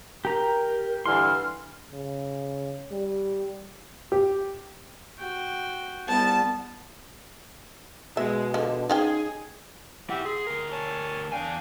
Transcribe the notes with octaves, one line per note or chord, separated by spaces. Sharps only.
G4 A#4 A#5
G2 D3 E3 C6 F6
C#3
G3
G4
F#4 G5
C2 G3 B3 A5
B2 G#3 E5
D3 F3 G#3
F3 C#4 D#4 G#4 G5
E4 G4 E5 F#5
G#4 C6
D2 A#4
C#5 G#5 A5
E2 D4 F5 G5 G#5